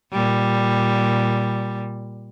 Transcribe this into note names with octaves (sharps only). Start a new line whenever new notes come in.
A#2 G3